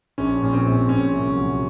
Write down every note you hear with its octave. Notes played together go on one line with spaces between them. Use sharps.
A#1 C#4
A#2 C#4
C4
A#1
A#2 C#4
C2
F#3